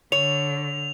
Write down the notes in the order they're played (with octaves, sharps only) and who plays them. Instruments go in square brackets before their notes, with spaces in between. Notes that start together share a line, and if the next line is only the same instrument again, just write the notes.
[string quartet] D3 [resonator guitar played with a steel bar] C#5 [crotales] F7